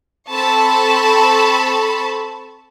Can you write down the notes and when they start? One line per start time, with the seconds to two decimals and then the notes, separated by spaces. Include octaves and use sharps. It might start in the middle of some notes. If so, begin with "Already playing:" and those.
0.31 C4 A4 A5 B5 C#6